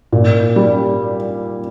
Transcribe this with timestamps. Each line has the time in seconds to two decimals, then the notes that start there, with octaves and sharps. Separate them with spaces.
0.12 A#2
0.56 G3